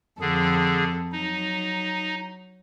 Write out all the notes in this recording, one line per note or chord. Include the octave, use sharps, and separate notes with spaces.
F2 D3 G#4 A4
F#3 D#4